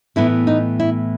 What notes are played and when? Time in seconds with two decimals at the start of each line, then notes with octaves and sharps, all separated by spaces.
0.16 A2 E3 B3 E4
0.47 D#4
0.80 E4